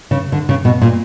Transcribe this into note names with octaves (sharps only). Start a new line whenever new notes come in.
C#3
D3
C#3
B2
A#2